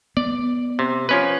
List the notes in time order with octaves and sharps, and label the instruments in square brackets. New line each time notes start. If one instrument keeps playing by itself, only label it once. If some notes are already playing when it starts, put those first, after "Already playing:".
[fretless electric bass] B3 [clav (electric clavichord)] D5
[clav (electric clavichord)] C3
F3 C#4 B4